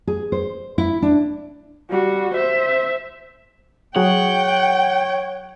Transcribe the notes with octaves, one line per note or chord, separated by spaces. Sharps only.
G#4
C5
E4
D4
G3 F#4
C5 E5
F#3 F#4 G#4 C#5 F#5 G5